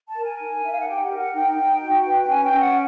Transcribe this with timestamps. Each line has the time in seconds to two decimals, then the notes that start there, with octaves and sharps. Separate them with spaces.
0.09 A5
0.16 A#4
0.25 G#5
0.40 D#4
0.64 D#4 E5
0.72 F5
0.79 F#5
0.87 G4 G5
1.03 F#5
1.10 A#4
1.18 F#5
1.34 D#4 G5
1.58 D#4
1.81 F#4
2.05 B4
2.23 G5
2.28 C#4 G#5
2.44 G5
2.52 C#4
2.60 F#5